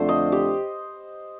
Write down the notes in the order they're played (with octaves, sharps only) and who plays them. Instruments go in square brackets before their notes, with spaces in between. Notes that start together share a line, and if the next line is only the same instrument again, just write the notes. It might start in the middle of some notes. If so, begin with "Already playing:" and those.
Already playing: [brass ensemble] F2 D3 A3 D4 [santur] C5
[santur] D#5
G4